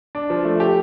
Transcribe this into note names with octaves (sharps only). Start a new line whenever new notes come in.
D4
F3
A3
G4